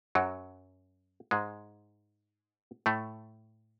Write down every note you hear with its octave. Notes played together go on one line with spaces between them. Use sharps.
F#2 F#3
G#2 G#3
A2 A3